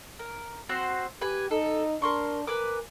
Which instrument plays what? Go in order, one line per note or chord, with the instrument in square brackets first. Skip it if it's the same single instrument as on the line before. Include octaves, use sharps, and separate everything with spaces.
[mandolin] A#4
C4 F#4 C5
[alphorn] G4 [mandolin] B4 G#5
[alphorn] D#4 [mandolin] A4
[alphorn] D4 [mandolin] A#4 C6 C#6
[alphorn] A#4 [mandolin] B4 G#5 D6